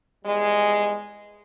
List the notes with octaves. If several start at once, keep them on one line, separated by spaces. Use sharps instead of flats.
E2 G3 G#3